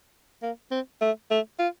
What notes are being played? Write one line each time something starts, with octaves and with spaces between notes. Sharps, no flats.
A#3
C4
A3
A3
F4